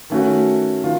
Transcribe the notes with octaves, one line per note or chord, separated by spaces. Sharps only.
D#3 A3 C#4 F#4
D#3 F4